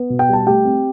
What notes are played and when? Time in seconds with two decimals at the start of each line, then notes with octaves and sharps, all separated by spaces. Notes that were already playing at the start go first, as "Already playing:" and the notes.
Already playing: B3
0.10 B2
0.19 G5
0.29 G3 A5
0.46 A3 G4 G5
0.65 C4